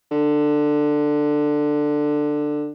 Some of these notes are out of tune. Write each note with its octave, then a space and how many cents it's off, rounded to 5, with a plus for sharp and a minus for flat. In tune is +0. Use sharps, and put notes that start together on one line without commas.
D3 +15